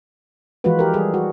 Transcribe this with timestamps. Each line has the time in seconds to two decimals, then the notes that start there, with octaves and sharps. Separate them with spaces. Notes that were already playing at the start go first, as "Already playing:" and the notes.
0.64 E3 F3 G#3 F4 F#4 B4
0.79 G4 A#4
0.93 G3 G#4 A4
1.14 F#4